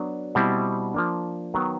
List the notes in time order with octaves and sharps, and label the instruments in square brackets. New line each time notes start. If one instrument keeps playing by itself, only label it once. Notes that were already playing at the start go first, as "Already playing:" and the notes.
Already playing: [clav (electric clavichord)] F#3 B3 D4
B2 G3 C4 E4
F3 A#3 D4
D#3 F#3 B3